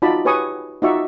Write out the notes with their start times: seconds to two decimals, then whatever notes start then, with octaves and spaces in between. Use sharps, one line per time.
0.02 D#4 F4 F#4 D5 A5 B5
0.25 G4 B4 C#5 G#5 C#6 D#6
0.82 D#4 F4 F#4 D5 E5 C#6